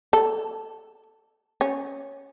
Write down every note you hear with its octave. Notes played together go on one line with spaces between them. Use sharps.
A4
C#4